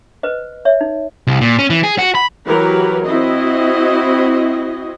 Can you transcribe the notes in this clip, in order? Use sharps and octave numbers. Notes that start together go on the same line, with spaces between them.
B4 C5 D#5
C#5 E5
D#4
C2
A#2
C#4
E3
G#4
F#4
B5
E3 F#3 G4 A#4 B4
C4 E4 F#4 D#5